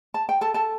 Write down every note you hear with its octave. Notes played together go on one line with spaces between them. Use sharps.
A5
G5
A4 A5
A4 A5